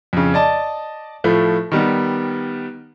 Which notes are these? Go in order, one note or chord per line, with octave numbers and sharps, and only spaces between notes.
F2 C#3
D5 D#5 A5
A2 F3 A3
D#3 G3 B3